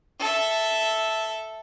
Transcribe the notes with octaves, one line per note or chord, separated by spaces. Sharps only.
A4 E5